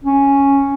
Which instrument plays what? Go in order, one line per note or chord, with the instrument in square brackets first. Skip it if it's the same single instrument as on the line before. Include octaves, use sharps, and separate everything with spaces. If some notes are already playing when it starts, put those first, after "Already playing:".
[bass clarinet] C#4